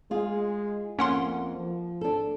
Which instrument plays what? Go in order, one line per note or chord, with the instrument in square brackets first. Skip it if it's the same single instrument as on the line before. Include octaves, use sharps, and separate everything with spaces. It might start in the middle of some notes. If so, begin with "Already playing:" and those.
[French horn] G#3 [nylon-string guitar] F4 G#4
[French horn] F2 [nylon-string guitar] A#3 [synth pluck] C#4 F#5 C6
[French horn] F3
[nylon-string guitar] D4 A4